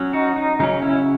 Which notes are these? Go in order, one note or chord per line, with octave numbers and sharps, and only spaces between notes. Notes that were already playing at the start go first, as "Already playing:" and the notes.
Already playing: F#3 C#4
D#4 F#4
D#4
C#3 F#3 C#4 D#4
C#4 E4